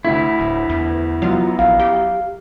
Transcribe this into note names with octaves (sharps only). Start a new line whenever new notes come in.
D2 A3 E4
D1
E2
F#2 F#3 B3 F4
A#1 F5
G4